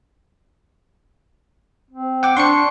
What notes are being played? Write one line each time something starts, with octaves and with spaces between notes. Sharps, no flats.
C4
F#5 G5 D6
D4 C6 C#6 C#7